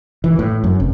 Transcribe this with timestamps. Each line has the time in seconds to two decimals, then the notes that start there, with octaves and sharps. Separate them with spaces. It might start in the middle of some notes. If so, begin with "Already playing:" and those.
0.24 E3
0.39 A2
0.64 F#2
0.80 F1